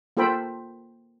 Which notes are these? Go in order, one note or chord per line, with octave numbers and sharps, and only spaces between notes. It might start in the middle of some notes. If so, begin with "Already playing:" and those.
A#3 F4 A4 C5 G5 B5